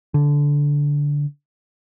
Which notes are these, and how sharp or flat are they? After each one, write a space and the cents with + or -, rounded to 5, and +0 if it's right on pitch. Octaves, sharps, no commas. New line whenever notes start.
D3 -15